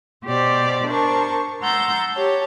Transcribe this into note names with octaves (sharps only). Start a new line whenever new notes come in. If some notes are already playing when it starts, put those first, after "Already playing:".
B2 G4 C5 D5
D4 A#4 C5 A5 C#6
F#5 A#5 C6 E6 G6 A6
G4 C#5 A5